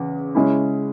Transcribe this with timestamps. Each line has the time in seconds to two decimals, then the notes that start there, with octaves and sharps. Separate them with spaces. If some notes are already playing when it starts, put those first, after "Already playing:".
Already playing: E2 C#3
0.35 C#3 G#3 C#4 E4